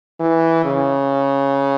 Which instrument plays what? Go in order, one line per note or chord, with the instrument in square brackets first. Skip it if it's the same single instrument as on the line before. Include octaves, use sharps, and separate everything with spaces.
[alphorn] E3
C#3